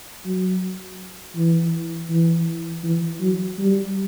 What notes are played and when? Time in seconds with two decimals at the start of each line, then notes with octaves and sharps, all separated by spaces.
0.26 F#3
1.36 E3
2.10 E3
2.84 E3
3.21 F#3
3.58 G3